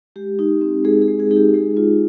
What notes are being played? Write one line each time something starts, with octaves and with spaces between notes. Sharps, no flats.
G#3 G4
D#4
C4
G#3 G#4
G#4
G#3
G#4
D#4 G#4
G4
G#3 G#4
F4